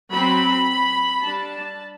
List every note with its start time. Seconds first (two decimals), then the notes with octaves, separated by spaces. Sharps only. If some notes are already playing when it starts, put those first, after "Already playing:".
0.12 F#3 C4 B5
1.23 G3 D4 A5